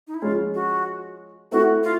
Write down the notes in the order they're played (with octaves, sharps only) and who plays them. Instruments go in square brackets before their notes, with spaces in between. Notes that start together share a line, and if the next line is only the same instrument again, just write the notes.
[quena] D#4
E4
[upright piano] F3 G#3 C#4 [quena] F4
[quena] F#4
[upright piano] A3 C4 E4 A4 [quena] F#4
[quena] F4